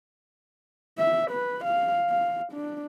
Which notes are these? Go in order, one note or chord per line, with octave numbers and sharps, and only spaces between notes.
E5
B4
F5
F5
D4